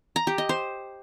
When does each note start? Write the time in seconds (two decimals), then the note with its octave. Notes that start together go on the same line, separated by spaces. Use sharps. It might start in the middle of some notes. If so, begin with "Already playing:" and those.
0.16 A#5
0.27 G4
0.38 D#5
0.49 C5